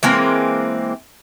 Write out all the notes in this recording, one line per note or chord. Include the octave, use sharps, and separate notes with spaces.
E3 G#3 A#3 C4